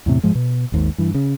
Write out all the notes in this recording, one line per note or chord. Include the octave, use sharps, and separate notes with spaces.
E2 A2 C3
G#2 F3 G#3
B2
G#1 D#2 G#2
G2 E3
C#3